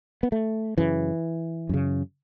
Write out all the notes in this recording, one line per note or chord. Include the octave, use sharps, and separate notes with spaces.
B3
A3
F#2 C#3 E3
F#2 C#3